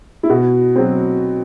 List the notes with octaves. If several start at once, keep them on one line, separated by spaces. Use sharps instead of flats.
E4
B2 F#4
F#3 C4